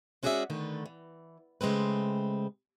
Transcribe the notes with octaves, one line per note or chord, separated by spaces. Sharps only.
G#3 C#4 F#4 G#4 D5 E5
D3 D#3 A3 B4
E3
C#3 G#3 A3 C4 B4